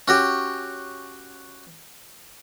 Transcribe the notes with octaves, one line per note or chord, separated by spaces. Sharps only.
C#4 F#4 G4